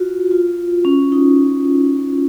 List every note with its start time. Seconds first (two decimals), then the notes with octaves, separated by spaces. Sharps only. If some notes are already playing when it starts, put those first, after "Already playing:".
Already playing: F4 F#4
0.31 F4
0.85 C#4
1.12 D#4